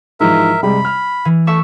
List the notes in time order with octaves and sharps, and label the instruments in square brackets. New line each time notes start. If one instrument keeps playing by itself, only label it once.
[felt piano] G#2 E3 F3 [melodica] A#4 E5
[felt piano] C3 G3 G#3 [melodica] B5
[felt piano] F6
[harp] E3
[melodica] A3 [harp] E5 C#6 E6